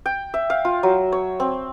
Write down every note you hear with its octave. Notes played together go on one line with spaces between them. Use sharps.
G5
E5
F5
F4
F#3
C#5
C4